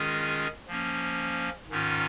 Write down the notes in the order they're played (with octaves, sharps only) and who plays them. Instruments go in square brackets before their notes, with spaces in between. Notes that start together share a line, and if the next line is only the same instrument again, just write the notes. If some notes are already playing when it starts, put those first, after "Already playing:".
Already playing: [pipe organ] D#3 G#3 C#4 F4 G#4
F3 A#3 C#4
G#2 D#3 C#4 F4